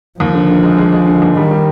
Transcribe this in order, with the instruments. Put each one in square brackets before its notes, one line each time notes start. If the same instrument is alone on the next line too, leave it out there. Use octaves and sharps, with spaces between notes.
[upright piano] D#2 [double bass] F3
[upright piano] D3
D3
G#3
G#3
G#3
D3
D#2
[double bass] D#3 [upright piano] G3
[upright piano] G3